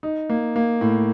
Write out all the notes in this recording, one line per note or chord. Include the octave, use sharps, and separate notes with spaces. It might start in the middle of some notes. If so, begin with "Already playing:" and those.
D#4
A#3
A#3
A2